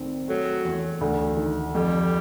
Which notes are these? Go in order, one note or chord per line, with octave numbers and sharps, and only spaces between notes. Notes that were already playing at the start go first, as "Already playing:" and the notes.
Already playing: C2 D#3 C4
F#3 A3
E2
D2
D#3
F2 G3